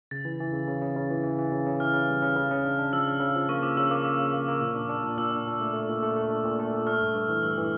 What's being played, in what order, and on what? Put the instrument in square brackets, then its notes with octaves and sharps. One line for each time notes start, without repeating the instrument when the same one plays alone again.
[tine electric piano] C#3 [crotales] A6
[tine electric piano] E3
E3
C#3
C#3
C#3
C#3
E3
E3
E3
C#3
C#3
[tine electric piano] E3 [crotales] F6
[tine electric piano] C#3
G3
C#3
C#3
C#3
D4
D4
[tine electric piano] F3 [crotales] E6
[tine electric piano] C#3
C#3
F3
[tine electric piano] A#3 [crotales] C#6
[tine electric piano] F3 [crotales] D6
[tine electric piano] C#3 [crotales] E6
[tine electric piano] A#3 [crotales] D6
[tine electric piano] C#3 [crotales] D6
[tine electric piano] C#3
A#3
A#3
A#2
D4
D4
A#2
[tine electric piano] A#2 [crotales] E6
[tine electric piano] D4
A#2
A3
A3
A#2
A3
A3
D4
A#2
A3
A#2
[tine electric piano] A3 [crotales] F6
[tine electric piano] G2
G2
E3
[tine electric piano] G2 [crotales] E6
[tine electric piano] E3